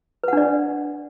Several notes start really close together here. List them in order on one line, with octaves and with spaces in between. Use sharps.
B4 F#5 D4 D5